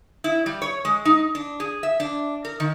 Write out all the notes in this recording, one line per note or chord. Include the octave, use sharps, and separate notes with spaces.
E4
G3
C#5
G#3
D#4
D4
G#4
E5
D4
A#4
D#3